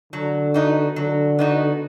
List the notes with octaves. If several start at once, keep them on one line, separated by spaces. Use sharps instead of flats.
D3 F#3
B3 D#4 F#4
D3 F#3
B3 D#4 F#4